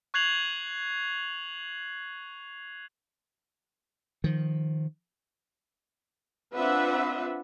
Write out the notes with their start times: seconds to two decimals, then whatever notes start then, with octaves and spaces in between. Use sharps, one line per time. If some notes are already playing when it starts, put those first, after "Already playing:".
0.14 C#6 F#6 G#6 C7 F7 F#7
4.24 D#3 F3
6.55 C4 D4 F4 B4 E5 F#5